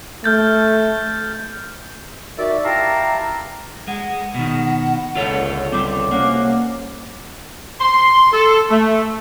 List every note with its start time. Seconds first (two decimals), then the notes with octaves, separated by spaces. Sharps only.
0.24 A3 F6 G6 A6
2.38 D#3 F#4 D5 E5
2.65 E4 G4 F5 A5 A#5
3.88 G#3 F#5
4.34 B2 D#3
5.15 C#2 D3 F4 A4 C#5
5.72 G3 C4 D6
6.11 C2 A#3 C#4 F#5
7.80 C6
8.32 A4
8.69 A3